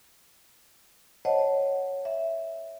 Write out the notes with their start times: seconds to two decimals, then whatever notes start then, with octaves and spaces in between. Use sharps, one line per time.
1.25 C5 C#5 D#5 F#5 A5
2.05 E5